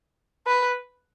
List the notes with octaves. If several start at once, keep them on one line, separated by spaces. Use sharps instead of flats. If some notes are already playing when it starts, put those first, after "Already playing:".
B4